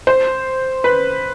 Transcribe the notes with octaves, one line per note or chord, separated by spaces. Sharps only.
C5
B4